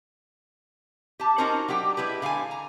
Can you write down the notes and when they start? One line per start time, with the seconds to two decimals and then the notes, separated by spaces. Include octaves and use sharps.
1.20 G4 A5
1.38 C#4 D#4 F4 F#4 A#4 C5
1.68 F#3 D4 G4 G5
1.97 G#3 E4 G4 B4
2.22 D3 F5 G5 G#5
2.51 A#5